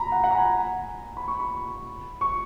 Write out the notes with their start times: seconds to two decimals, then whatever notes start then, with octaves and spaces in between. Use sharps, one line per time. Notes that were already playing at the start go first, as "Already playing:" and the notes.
Already playing: A#5 B5
0.12 F#5
0.24 F#5
0.31 A#5
0.35 G#5
1.17 B5
1.28 C#6
1.40 B5
2.21 C#6